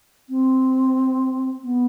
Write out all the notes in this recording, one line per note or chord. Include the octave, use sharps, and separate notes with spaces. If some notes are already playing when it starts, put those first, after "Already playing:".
C4
B3